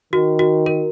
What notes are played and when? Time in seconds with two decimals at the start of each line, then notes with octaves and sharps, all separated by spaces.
0.13 D#3 F#4
0.39 F#4
0.66 A#4